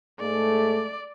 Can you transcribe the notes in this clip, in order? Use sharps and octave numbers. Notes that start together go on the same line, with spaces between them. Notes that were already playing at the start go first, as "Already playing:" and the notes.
G#2 G#3 A3 D5